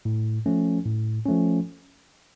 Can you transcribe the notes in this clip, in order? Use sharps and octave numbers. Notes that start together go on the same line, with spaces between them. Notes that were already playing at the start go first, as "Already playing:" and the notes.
A2
F3 A3 C#4
A2
F3 A3 C#4